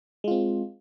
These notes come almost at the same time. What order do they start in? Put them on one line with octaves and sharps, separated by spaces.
G#3 F4 C4